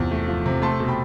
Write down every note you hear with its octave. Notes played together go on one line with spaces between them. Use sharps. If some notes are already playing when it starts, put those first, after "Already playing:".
Already playing: E2 C3 F3
A3
F3
C3
A3 A5 C6
B2
G5 B5